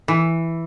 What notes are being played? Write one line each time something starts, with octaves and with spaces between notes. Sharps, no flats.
E3